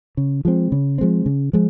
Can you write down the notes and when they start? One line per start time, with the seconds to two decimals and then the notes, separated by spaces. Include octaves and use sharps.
0.17 C#3
0.45 F3 G#3 C4
0.72 C#3
0.98 F3 G#3 C4
1.26 C#3
1.53 F3 G#3